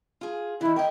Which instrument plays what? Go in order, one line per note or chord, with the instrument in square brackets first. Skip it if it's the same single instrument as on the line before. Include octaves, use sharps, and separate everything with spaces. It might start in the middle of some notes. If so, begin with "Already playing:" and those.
[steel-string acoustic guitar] F4 G#4
[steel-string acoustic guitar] D#3 E3 [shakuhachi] E4
[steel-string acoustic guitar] A#4 D#5 [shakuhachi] G5